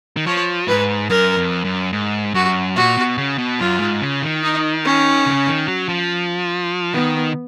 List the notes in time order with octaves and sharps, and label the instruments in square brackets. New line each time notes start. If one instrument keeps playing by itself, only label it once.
[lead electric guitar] D#3
[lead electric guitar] F3 [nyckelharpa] C#5
[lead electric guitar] G#2 [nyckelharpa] B4
[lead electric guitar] F#2 [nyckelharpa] A#4
[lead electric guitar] F2
F#2
G#2
[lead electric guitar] F#2 [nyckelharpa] F#4
[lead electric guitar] A#2 [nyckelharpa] F#4
[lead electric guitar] B2
C#3
B2
[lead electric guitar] F#2 [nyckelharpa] F4
[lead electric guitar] G#2
C#3
D#3
[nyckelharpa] D#4
C#4
[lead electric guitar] C#3
D#3
F#3
F3
[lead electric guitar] D#3 [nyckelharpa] B3